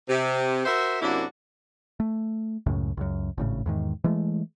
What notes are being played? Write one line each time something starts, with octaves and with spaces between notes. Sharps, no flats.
C3
F#4 A#4 C5 E5
F#2 C3 A#3 D4 E4 F#4
A3
C#2 F#2 A2 C#3
C#2 F#2
G#1 A2 C#3
E2 G#2 D#3
E3 G#3 A3